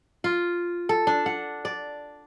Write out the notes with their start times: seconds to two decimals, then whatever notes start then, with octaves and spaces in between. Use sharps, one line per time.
0.24 F4
0.89 A4
1.07 D4
1.26 F#5
1.65 D5